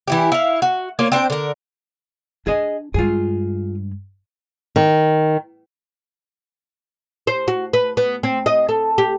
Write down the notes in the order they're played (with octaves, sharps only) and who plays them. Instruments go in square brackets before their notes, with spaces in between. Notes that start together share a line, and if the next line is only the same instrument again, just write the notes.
[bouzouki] E3 E4 G4
E4 F5
F#4
A#3 F4 C#5
C4 D4 C5 G5
D3 A#4
[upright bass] D4 [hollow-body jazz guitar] G#4 D#5
[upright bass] G2 G#3 [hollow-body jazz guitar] F4 G#4
[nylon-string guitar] D#3
[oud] C5
F#4
B4
B3
C4
D#5
A4
G4